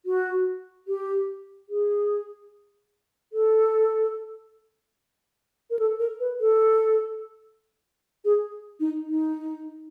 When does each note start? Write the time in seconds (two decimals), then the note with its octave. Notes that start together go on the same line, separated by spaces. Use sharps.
0.06 F#4
0.88 G4
1.69 G#4
3.33 A4
5.70 A#4
5.79 A4
5.99 A#4
6.20 B4
6.40 A4
8.25 G#4
8.80 D#4
9.07 D#4